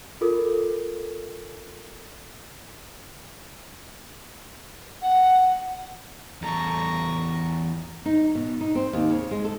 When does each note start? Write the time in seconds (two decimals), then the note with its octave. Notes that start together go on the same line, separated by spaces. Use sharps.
0.21 F4 A4 A#4
5.02 F#5
6.42 E2 A4 A#5 C#6
8.06 D#4
8.35 B2
8.61 D#4
8.75 C4
8.93 D#2
9.10 C#3
9.31 G#3
9.45 A4